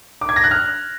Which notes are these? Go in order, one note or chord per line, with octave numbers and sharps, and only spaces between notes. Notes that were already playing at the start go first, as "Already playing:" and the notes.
D6
G#6
A#6
F#6
F6